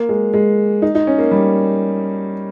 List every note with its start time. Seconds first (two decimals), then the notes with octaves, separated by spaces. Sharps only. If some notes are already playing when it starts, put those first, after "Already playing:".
Already playing: A#3
0.09 G#3
0.34 G#3
0.82 D#4
0.95 D#4
1.07 C#4
1.19 A#3
1.31 G3